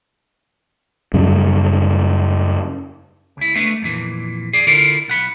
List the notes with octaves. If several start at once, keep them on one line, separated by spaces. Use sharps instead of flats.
F#2 C#3 G3
C#2 E4
A3 B3 D4 E5
F2 A#2 E3
G#4 D5
D3 E4 F4 A4 A#4
B1 F#5 B5